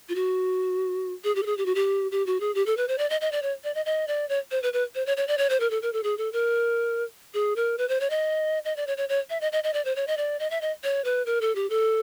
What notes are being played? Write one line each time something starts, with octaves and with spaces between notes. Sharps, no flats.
F4
F#4
G#4
G4
A4
G#4
G4
F#4
G4
G4
F#4
G#4
G4
A4
B4
C5
D5
D#5
D#5
D5
C#5
D5
D#5
D#5
D5
C#5
C5
B4
B4
C5
C#5
C#5
D5
C#5
C5
A#4
A4
A#4
A4
G#4
A4
A#4
G#4
A#4
B4
C5
C#5
D#5
D#5
D5
C#5
C#5
C#5
E5
D#5
D#5
D#5
D5
C5
C#5
D#5
D5
D#5
E5
D#5
C#5
B4
A#4
A4
G4
A4